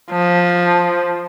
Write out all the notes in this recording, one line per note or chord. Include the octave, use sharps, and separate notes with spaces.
F3